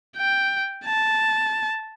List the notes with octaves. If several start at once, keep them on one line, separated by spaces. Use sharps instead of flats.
G5
A5